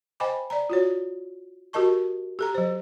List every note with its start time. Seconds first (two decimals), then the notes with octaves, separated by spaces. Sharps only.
0.20 C5 D#5 G5 G#5 B5 D6
0.50 D5 A#5
0.70 F4 F#4 C#5
1.73 F#4 G4 A#4 D#5 A5 C#6
2.39 G4 A4 A#5
2.55 F#3 C5